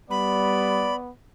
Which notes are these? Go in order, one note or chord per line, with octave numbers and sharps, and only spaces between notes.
G3 B3 D5 B5